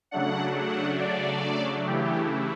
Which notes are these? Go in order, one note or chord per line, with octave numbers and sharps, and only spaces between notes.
C#3 F#3 A3 D4 F#5
F#5
D5
C#3 E3 A3 E4 G4